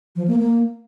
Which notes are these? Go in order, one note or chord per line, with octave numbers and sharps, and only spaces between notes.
F3
A#3
A#3